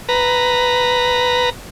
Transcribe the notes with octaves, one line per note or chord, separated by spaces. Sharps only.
B4 A#5